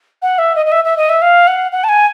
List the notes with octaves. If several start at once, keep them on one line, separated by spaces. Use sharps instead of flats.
F#5
E5
D#5
D#5
E5
E5
D#5
E5
F5
F#5
F#5
A5
G#5